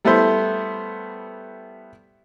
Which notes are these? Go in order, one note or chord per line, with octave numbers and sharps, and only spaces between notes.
G3 A3 B3 E4 A4 C5